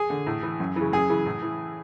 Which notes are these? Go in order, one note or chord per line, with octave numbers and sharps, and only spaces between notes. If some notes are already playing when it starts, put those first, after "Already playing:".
Already playing: G#4
D3
A2
E3
F#2
C#3 E3
F#2 G#4
C#3 E3
A2
E3